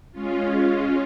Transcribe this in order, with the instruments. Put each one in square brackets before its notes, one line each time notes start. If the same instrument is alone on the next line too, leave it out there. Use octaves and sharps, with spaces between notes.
[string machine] G#3 C#4 F4